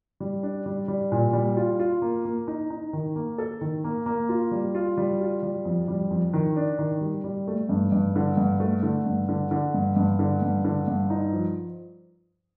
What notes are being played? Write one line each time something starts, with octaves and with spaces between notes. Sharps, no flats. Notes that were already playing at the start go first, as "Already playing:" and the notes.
G3
D4
G3
G3
A#2
G3
F4
F4
A#3
A#3
D#4
D#4
D#3
A#3
A4
D#3
A#3
A#3
F4
G3
F4
G3
F4
G3
F2
G3
F2
D#3
D4
D#3
G3
G3
A3
G2
G2
D3
G2
A3
D3
G2
D3
D3
G2
G2
D3
G2
D3
G2
D#4
F3